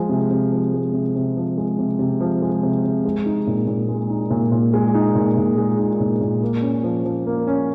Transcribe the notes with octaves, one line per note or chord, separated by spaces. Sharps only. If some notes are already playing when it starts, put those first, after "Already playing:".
Already playing: F3 G#3
C3
C3
F3
G#3
C3
C3
F3
G#3
C3
C3
F3
G#3
C3
C3
G#3
D#4
A#2
A#2
G#3
D#4
A#2
A#2
G#3
D#4
A#2
A#2
G#3
D#4
A#2
A#2
A#3
C#4
F3
F3
A#3
C#4